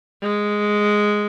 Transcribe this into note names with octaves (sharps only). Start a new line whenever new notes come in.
G#3